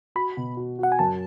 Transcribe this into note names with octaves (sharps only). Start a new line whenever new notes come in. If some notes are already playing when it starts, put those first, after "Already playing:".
F#4 B5
B2
F#4
F#4 F#5
G#5
F#2 A5